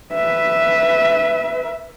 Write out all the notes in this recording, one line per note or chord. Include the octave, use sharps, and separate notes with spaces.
B4 E5